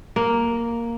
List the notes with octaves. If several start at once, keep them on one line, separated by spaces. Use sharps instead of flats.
A#3